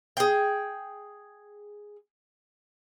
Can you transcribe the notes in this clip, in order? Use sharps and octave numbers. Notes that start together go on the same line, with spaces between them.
G#4 G5